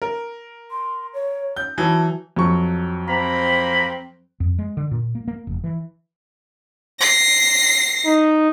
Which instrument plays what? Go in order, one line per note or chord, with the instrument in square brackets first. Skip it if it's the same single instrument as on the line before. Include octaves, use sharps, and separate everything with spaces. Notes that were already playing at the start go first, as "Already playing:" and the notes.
[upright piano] A#4
[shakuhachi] C6
C#5
[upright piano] G6
[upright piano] E3 F#3 [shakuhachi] A5
[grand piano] F2 F#3 C#6
[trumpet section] A#3 A#5 B5 [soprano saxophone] C4
[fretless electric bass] F2
G#3
D3
A#2
A#3
A#3
F1
E3
[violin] A#6 C7
[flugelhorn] D#4